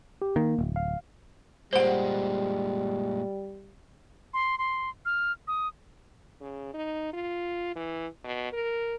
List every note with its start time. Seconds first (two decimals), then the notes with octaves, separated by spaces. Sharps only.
0.22 G4
0.36 D#3 A#3
0.59 D1
0.76 F5
1.73 A#2 G3 G#3 C5 F#5
4.34 C6
4.58 C6
5.06 F6
5.48 D#6
6.41 C#3
6.74 D#4
7.13 F4
7.75 E3
8.24 B2
8.53 A#4